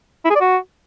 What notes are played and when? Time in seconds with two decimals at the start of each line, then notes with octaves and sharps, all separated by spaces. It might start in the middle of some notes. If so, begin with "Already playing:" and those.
0.25 E4
0.30 G#4
0.35 D5
0.41 F#4